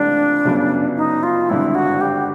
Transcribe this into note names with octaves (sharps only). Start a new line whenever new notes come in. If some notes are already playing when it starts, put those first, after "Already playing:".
Already playing: C#2 C3 E3 A3 D4
G1 F#2 C#3
D#4
F4
G#1 G2 D3 E4
F#4
G4